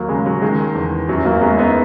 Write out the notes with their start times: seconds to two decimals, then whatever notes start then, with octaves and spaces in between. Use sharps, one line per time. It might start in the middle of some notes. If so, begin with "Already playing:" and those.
Already playing: D#2 F#3 A#3
0.09 C#3 G#3
0.26 F#3
0.41 D#3 G#3
0.75 E2
1.09 F#2 F#3
1.25 F#3 A#3
1.41 F#2 G#3 B3
1.58 B3 D#4